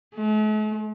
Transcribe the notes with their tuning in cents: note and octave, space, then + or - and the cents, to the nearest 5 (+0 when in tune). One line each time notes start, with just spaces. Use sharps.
A3 -45